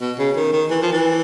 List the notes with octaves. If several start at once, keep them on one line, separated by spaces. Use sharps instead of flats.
B2
C#3
D#3
D#3
E3
F3
E3